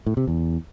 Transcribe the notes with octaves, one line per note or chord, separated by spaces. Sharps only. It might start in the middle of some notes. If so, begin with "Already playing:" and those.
A2
C3
E2